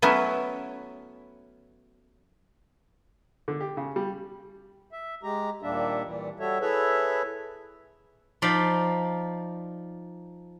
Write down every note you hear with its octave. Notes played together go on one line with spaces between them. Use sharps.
F#3 A3 B3 C#4 E4
D3
G4
C#3
G3
E5
G#3 G4 A#5
D#2 A#2 G3 A#3 D4 E5
A#2 E3 G3
G3 F#4 A4 C#5 E5
E4 G#4 A4 B4 C#5 E5
F3 D#4 D5 F5 B5